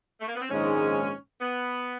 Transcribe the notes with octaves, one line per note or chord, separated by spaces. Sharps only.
A3
A#3
B3
C4
A#1 G#2 D#3 G#3 C#4
B3